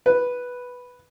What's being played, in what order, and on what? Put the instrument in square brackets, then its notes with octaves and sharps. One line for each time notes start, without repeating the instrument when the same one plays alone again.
[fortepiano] B4